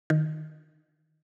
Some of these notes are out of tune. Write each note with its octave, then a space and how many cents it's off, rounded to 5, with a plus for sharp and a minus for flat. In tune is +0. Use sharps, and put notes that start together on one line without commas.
D#3 -10